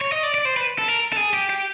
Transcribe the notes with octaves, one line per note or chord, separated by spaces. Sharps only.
C#5
D#5
D5
D5
C5
B4
A4
A#4
A4
G#4
G4
G4